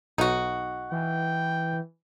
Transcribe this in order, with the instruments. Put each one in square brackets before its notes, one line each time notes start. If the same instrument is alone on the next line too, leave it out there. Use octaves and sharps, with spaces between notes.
[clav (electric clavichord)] B1 [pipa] D#4 F#4
[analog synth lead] E3 [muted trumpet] G5